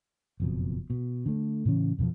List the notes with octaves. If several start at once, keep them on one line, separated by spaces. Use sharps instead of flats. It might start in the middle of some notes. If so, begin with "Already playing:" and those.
F#1 F2 B2
B2
D3 A3
A2 C#3 E3 C#4
F2 B2 D3 F3